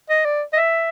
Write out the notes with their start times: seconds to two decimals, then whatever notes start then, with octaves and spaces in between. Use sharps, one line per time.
0.09 D#5
0.25 D5
0.53 D#5
0.56 E5